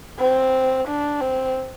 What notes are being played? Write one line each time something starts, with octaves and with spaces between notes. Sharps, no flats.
C4
D4
C4